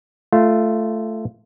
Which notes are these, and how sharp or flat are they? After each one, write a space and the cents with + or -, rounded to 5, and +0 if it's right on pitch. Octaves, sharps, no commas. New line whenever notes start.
A3 +0 F4 -10